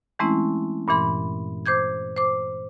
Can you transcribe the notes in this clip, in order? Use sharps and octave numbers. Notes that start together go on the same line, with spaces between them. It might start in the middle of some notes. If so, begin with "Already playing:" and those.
E3 G#3 A3 C4 C#4 E4
G2 A#2 E3 B5 C6
C5 D6 G6 G#6
C5 D6